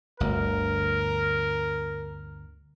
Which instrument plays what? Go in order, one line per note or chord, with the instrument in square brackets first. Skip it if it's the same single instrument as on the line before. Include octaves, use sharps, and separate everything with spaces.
[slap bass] G1 D2 [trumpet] A#4